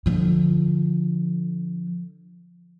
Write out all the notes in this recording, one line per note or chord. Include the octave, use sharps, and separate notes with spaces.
D3 F3